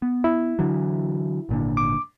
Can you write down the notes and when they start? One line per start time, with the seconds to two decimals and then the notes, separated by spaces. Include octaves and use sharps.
0.02 B3
0.24 E4
0.59 D3 E3 F#3
1.49 G#1 A#2 D3
1.77 D6